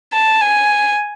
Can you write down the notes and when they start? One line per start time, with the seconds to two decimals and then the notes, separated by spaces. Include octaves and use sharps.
0.13 A5
0.42 G#5